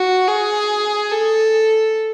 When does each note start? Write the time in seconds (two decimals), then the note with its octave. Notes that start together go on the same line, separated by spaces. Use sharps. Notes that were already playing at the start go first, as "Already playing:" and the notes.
Already playing: F#4
0.27 G#4
1.12 A4